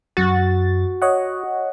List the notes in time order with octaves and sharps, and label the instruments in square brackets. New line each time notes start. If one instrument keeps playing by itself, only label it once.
[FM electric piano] F#2 A6 [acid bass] F#4
[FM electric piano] C#5 D#5 F#5